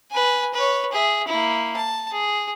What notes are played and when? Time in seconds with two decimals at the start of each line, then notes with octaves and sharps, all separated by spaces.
0.11 B4 G#5
0.54 B4 C#5
0.92 G#4 E5
1.28 A#3 E4
1.76 A5
2.11 G#4